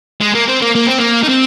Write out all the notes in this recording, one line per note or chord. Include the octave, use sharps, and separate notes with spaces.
G#3
A#3
C4
A#3
A#3
C4
A#3
D#4
C4